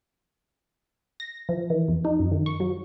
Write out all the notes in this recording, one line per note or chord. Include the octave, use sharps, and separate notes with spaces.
A#6
F3
E3
F2
D#4
F#2
D#3
C#6
F#3